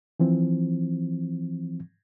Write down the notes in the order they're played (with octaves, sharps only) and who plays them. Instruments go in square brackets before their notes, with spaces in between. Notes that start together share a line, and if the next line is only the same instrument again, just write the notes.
[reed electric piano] E3 F3 C4